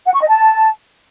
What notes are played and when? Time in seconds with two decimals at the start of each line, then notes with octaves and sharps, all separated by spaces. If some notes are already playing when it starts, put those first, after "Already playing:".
0.06 F#5
0.14 C#6
0.21 D#5
0.28 A5